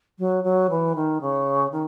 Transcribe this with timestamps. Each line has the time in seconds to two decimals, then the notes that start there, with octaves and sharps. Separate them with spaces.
0.19 F#3
0.44 F#3
0.70 E3
0.95 D#3
1.21 C#3
1.72 D#3